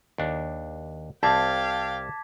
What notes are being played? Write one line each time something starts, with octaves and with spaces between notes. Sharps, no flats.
D#2 D4
C2 C4 F5 G5 A5 D6 G#6 B6